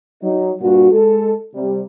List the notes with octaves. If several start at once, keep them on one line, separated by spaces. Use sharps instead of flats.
F#3 D#4
G2 A#2 F#4
G#3 A4
C3 G3